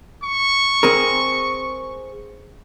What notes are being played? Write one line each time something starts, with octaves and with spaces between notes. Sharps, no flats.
C#6
C4 G#4 A#4